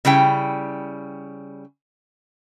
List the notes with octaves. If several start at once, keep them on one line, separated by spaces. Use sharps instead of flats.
C#3 G3 E4 G5